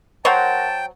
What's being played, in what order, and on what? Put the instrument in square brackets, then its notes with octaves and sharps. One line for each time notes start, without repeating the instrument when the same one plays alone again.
[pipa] F#3 C5 C#5 [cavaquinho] A#4 F#5 A#5 [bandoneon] G5 [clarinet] A5